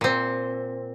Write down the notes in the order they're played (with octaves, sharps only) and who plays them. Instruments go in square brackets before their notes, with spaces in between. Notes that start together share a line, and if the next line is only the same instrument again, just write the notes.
[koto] A#2 C4